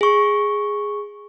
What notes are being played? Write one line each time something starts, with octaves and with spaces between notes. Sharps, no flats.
G#4 C#6